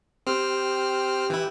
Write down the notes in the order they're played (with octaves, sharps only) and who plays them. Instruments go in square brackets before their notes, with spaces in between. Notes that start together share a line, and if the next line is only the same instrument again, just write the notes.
[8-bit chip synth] C4 F6 [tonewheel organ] G4
[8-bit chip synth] E3 E4